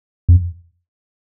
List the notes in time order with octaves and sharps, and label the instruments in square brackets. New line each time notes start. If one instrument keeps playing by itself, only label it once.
[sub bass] F2